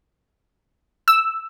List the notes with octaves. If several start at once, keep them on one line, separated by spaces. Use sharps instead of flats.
E6